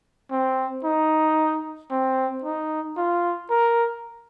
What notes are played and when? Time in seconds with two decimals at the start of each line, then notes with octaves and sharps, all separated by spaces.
0.31 C4
0.84 D#4
1.91 C4
2.44 D#4
2.97 F4
3.50 A#4